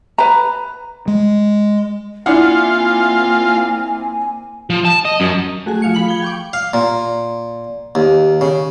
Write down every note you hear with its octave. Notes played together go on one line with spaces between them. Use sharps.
B4 A#5
G#3
A#3 C4 D4 E4 F4 F5 F#5 G#5
F3
A5
D#5
F#2
A3 F#4 G#4 G#5
F3 F5 C#7
F3 B5 F#7
G#6 G7
G5 C#6 D6
F5
A#2
D#2
C#3